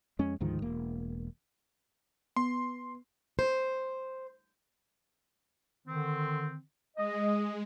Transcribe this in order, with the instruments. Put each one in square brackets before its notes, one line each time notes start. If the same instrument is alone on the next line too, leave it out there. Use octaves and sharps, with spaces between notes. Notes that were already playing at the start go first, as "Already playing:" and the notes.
[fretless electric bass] F2 G#3 C#4
D2 G#2 D#3 F3
E1 A#3
[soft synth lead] B3 [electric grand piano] C6
[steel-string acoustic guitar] C5
[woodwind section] D3 D#3 C4
[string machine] G#3 [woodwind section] D#5